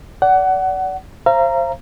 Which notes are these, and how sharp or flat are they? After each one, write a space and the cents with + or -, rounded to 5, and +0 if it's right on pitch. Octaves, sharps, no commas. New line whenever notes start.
D5 -25 F#5 +20
C5 +25 F5 -40 A#5 +0